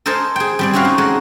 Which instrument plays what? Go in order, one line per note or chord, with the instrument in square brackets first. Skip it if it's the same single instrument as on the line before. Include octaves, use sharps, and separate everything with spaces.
[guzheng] A4 A#4 C5 D#5 G#5 A5
G#4 G5
G3 C4 D5
C4 C#4 E4 F#4 F5
D#4
G#3 F#4 A4